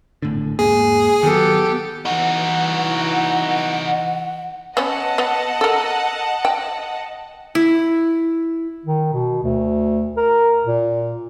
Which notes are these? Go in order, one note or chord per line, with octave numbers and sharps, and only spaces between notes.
G#1 A2 D3
E1 G#2 A#3 G#4
D#3 F#3 B3 G4 A4
E3 D#4 F#4 F#5
B3 C#4 D#5 F#5 A5
B3
A4 A#4
G5
E4
D#3
B2
D2
A#4
A#2